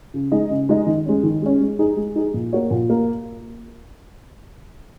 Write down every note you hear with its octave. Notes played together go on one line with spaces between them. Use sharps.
C#3
G#3 D#4 G#4 D#5
C#3
G#3 D#4 G#4 D#5
D#3
G#3 C#4
D#3
G#3 C#4
G#3
D#4 G#4
G#3
D#4 G#4
A#2
A#3 F#4 C#5
A#2
A#3